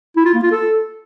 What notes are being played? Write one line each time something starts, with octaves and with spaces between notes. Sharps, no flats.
E4
F4
A#3
F4
A4